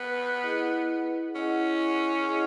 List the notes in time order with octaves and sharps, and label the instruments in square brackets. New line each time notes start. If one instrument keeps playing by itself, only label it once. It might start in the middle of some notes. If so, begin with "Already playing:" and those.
Already playing: [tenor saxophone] B3
[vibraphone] E4 G#4 D#5 F#5
[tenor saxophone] C#4 [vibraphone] E4 G#4 D#5 F#5
[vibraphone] E4 G#4 D#5 F#5